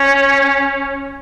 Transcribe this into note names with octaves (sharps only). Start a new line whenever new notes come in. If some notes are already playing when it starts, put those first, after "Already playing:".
Already playing: C#4